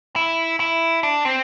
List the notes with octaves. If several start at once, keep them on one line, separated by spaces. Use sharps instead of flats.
E4
E4
D4
C4